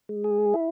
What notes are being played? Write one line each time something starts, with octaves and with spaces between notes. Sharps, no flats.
G#3
G#4
E4